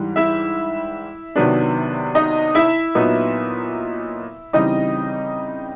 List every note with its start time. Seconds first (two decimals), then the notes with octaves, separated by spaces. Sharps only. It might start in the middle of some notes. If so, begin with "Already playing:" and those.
Already playing: G#2 E3 G3
0.16 E4 E5
1.36 C3 D#3 F#3 B3 D4
2.15 D#4 D#5
2.55 E4 E5
2.95 A#2 F#3 B3 D#4
4.53 C#3 E3 G3 C4 D#4 D#5